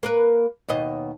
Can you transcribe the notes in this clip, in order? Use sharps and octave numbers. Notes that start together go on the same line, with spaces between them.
A#3 A#4 B4
D#2 B2 D#5